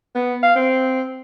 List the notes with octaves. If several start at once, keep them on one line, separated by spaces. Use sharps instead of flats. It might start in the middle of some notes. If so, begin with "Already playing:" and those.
B3
F5
C4